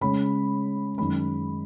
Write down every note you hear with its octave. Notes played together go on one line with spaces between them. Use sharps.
C#3 G#3 C#4 B5
F#2 D#3 G#3 C#4 B5